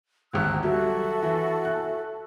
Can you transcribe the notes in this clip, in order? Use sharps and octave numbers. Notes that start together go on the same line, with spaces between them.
G#1 D2 E6 F#6
F#3 G3 F#4 A4 E5
E3
F#6